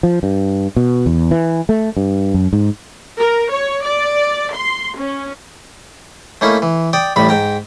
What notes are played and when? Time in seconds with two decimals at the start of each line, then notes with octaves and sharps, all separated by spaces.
0.03 F3
0.23 G2
0.76 B2
1.06 E2
1.31 E3
1.69 A3
1.97 G2
2.34 F#2
2.53 G#2
3.18 A#4
3.51 C#5
3.83 D5
4.54 C6
4.97 C#4
6.41 A3 A#3 C#4 D#4 E4
6.62 E3
6.93 D5 G5 D#6
7.16 A1 A2 G3 B5
7.29 G#2 G5 A#5